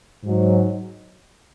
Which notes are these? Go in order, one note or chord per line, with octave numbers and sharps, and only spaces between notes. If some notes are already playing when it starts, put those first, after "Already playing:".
G#2 F#3